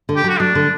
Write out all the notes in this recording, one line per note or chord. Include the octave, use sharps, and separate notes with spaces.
D3
G4
F#3 F#4
F#3 D4
D3